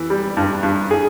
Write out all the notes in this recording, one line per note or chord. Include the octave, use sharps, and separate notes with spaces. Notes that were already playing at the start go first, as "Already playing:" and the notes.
Already playing: E3
G3
G2
G2
G#4